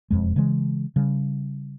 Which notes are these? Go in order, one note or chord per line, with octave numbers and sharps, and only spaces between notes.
E1 F2 G#3
C#3 E3 G#3
C#3 G3